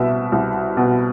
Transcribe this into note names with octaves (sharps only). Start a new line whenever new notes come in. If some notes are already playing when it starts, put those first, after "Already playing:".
Already playing: C2 B2 E5
C2
B2